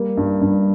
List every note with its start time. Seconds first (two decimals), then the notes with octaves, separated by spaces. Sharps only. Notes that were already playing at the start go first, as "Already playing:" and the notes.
Already playing: G3 A#3
0.17 G2
0.41 G2